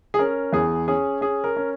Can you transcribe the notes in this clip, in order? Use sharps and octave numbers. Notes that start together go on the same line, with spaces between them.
G#4
C#4 A#4
E2 G#4
C#4 G#4
C#4 G#4
A#4
C#4